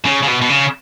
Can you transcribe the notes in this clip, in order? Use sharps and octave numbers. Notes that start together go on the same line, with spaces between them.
C#3
C#3
B2
B2
C#3